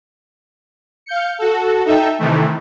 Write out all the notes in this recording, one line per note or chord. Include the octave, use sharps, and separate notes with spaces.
F5 G6 C#7
F#4 A4
D#4 A4 E5 G5
C3 D#3 E3 A3